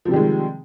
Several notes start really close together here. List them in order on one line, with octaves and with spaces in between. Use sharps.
F3 C3 G3 D#3 G#3